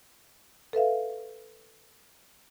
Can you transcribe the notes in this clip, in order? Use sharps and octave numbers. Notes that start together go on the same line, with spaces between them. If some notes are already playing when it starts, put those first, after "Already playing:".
A4 B4 E5 F5